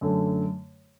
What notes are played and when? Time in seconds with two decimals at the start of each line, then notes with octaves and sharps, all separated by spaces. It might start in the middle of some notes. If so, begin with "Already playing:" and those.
0.01 F#2 D3 A3